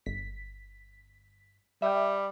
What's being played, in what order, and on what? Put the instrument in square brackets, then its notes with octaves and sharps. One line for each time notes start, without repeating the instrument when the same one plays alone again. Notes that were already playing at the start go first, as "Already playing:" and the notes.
[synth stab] G1 B6
[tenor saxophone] G3 [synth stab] E5 G5